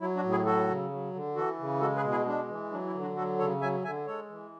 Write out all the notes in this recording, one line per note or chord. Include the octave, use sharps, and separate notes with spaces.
F#3 E4
D4 F#4
A2
E4 G#4
F#3 F#4 A4
C#3
F#3
D3
E3 F#4 A4
C#3
G#3 F#4 A4
G#4 B4
B2
E4 G#4
G#3 D4
E3
F#3 D4
E4
D3
D4 F#4
F#3 F#4 A4
C#3 A4 C#5
F#3 E5 G#5
D3 E5 G#5
G#3 A4 C#5
E3